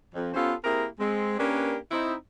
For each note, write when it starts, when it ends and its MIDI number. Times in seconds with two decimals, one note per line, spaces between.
0.15 0.31 41
0.34 0.53 59
0.34 0.53 61
0.34 0.53 65
0.34 0.53 67
0.34 0.53 69
0.34 0.53 72
0.64 0.86 58
0.64 0.86 60
0.64 0.86 64
0.64 0.86 67
0.64 0.86 68
0.64 0.86 70
0.99 1.35 56
0.99 1.35 60
1.38 1.76 58
1.38 1.76 61
1.38 1.76 62
1.38 1.76 67
1.38 1.76 70
1.38 1.76 71
1.91 2.14 60
1.91 2.14 63
1.91 2.14 64